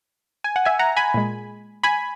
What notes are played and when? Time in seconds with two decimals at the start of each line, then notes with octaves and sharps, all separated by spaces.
0.44 G#5
0.56 F#5
0.65 E5 G#5
0.79 F#5 A#5
0.97 G#5 B5
1.14 A#2 G#3
1.84 G#5 B5